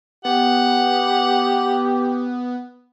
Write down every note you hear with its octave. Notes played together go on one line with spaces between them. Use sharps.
B3 G4 F#5